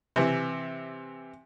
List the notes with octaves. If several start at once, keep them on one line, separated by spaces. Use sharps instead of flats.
C3 E3